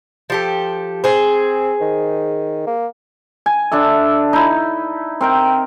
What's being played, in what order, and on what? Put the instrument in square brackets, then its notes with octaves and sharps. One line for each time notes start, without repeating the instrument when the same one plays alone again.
[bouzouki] F3 G4 A4
[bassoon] C4 [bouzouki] G#4 C5
[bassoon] D#3
A#3
[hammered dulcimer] G#5
D3 D4 A4 E5
D#4 E4
C4 A#4 G5